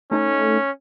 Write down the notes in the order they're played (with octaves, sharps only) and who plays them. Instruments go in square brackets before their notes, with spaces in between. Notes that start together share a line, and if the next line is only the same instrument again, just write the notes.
[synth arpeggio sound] A3 D#4 A4 [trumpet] C#4